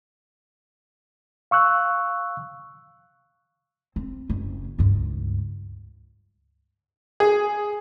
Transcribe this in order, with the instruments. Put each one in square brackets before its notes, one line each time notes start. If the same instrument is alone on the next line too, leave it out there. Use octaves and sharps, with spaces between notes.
[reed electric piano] F5 C#6 E6 F#6
[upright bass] C4
F#1
C#2 G2
[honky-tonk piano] G#4